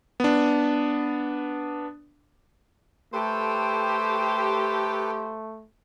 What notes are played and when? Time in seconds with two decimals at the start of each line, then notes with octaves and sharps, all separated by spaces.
0.20 B3 D4
3.13 A3 G4 A4 B4 C5